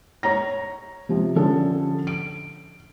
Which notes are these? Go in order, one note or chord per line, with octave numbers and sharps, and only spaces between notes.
C#5 A#5 A#6
C3 F3
D3 F3 C#4 A4
D7